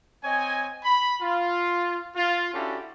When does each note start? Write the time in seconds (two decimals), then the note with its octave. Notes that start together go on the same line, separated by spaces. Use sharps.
0.24 C4 C#5 D#5 G#5
0.84 B5
1.22 F4
2.17 F4
2.54 C#4 D4 E4 F#4 G4 A4